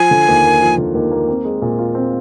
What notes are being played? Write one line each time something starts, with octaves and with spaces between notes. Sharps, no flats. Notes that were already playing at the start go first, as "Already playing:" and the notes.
Already playing: F3 G#5
D3
D#2
A#3
F3
D3
D#2
A#3
C4
G#3
A#2
F4
C4